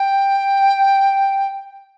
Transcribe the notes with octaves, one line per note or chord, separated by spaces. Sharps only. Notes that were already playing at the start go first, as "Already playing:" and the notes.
Already playing: G5